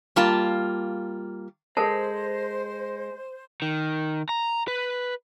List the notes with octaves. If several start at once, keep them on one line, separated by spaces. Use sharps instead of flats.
G3 A#3 F4 A5
G#3 A4 A#4 C5 A5
D#3
A#5
B4